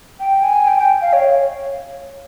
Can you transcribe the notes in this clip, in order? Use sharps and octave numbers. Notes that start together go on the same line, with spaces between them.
G5
G#5
G5
G5
F5
C#5